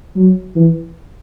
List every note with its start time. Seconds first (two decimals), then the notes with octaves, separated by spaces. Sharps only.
0.16 F#3
0.56 E3